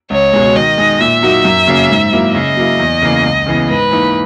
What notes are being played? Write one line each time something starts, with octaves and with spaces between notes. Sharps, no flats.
C#2 C#5
B2 G#3
D#3 D#5
G#3 D#4
A#2 E5
F#3 A#3 D#4 F#4
F#2
C#3 F#3 A#3 C#4
G#2
F#3 A#3 E4
C#3 D#5
F#3 A#3 E4
E2
C#3 E3 A#3
C#2
C#3 E3 B3
G#2 B4
E3 A#3 D#4